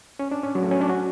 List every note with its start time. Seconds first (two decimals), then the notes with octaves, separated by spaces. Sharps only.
0.19 C#4
0.31 D4
0.43 C#4
0.55 F#3
0.63 A3
0.71 C#4
0.81 D4
0.89 F#4